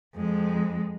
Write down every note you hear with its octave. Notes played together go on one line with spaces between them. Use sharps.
F2 G#3